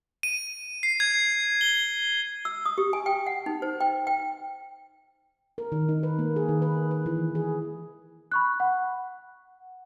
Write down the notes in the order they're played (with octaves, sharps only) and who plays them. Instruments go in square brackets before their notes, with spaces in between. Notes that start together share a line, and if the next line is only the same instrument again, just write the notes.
[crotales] D#7
C7
G#6
G7
[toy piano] E6
D#6
G4
G#5
G5
F#5
D#4
C5
G5
G5
[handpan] A#4
D#3
D#4
B4
A#3
G#4
D#3
B4
B4
E3
G#4
[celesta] B5 C#6 F#6
F#5